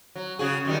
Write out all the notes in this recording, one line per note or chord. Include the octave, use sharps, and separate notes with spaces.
F#3
C#3 F#4 G#4
F#2 D#3 G3